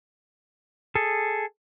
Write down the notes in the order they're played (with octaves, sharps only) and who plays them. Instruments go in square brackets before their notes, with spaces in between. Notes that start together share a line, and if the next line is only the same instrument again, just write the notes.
[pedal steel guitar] G#4 A4